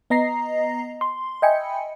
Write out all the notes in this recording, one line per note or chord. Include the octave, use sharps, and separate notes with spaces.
B3 D#5 A#5 A#6 C7
C6
D#5 E5 G5 G#5 B5 C#7